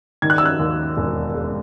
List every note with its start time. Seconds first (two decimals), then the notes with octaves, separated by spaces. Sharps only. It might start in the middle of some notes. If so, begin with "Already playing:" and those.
0.22 D#3 G#6
0.30 F#6
0.38 E6
0.46 F#6
0.59 D#2
0.97 E1
1.35 G#3